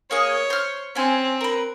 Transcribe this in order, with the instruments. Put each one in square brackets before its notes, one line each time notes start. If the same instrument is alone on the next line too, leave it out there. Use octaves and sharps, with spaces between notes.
[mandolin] A#3 G#4 D#5 [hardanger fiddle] C#5
[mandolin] C5 F6
[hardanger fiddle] C4 [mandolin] C#4 G#5
[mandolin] A#4 B4